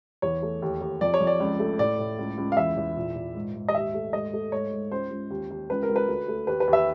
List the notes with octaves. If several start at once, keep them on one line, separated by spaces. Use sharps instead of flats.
E2 C#5
A3
D#2
D#2
F2 D5
C#5
F2
D5
C#2
A3
A2 D5
A2
C#2
C#2
F5
E2 E5
E2
A#2
A#2
G#2
G#2
D#5
D#2 E5
A3
G#2 D#5
A3
G#2 C#5
G#2
C#2 C5
C#2
D#2
D#2
C#2 B4
A#4
C#2
B4
D2
A3
D#2 B4
B4
D#2
E5